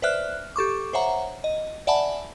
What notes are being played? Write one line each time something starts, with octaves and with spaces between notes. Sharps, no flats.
B4 C5 D5 E5 F6 F#6
G4 A4 C#6 D6
C5 C#5 E5 F#5 A#5
D#5
D5 E5 F#5 G#5 A5 B5